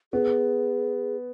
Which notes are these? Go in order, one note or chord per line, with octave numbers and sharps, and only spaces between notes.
B3 G#4